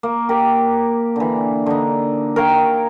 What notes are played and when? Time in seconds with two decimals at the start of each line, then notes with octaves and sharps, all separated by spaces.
0.03 A#3
0.29 G4 A#4
1.16 D3 E3
1.66 D3 D#4
2.36 A#4 C#5 F5 G5